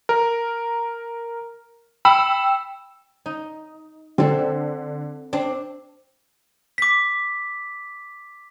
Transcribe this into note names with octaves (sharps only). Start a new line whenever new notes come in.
A#4
G5 B5 E6 E7
D#4
D3 C4 A4
C4 D4
D6 B6